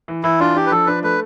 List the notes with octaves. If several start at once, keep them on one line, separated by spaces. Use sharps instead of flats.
E3
E3 E4
D4 F4
D4 G4
B4
F3 A4
D4 B4
A3 B4